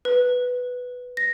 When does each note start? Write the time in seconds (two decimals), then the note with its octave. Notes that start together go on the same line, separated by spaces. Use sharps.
0.05 B4
1.17 A#6